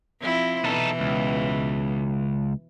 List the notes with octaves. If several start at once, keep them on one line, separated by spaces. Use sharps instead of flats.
F3 C4 E4
B2 E3 D#4 A4
C#2